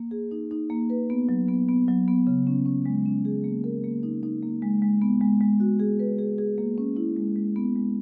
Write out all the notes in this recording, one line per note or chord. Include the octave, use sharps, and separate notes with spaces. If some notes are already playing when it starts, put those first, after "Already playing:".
Already playing: A#3
G#4
D#4
D#4
A#3
B4
B3
F#3
B3
B3
F#3
B3
C#3
C#4
C#4
G#3
C#4
G#4
A#3
A#4
A#3
D#4
D#4
A#3
G#3
G#3
B3
G#3
G#3
F#4
G#4
B4
G#4
G#4
A#3
C#4
E4
G#3
G#3
B3
G#3